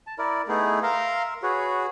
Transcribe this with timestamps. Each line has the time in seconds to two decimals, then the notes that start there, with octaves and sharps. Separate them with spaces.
0.07 A5
0.18 E4 A#4 D5
0.48 A3 B3 D#4 E4 G#4
0.83 A#4 E5 F5 A#5 C6
1.43 F#4 G#4 B4 C#5